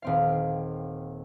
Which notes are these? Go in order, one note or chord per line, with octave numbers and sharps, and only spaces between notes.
D#1 C4 F5